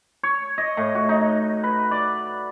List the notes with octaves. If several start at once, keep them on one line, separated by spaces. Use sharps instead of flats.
C#5
D#5
A2
F#4
D#4
B4
D5